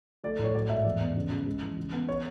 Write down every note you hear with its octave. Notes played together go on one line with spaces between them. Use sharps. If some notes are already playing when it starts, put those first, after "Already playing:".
A3 D5
A2
C#5
F#3 D5
G#2 E5
E2 D5
B3
C#3
C#3
G#3
E3
C#3
B3
C#5